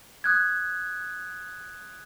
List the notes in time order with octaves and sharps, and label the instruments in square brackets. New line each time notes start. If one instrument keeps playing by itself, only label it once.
[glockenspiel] D#6 F#6 G#6